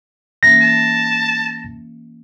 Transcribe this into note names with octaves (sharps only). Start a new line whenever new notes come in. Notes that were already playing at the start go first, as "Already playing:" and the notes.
E3 A#3 C#4 A#6
A5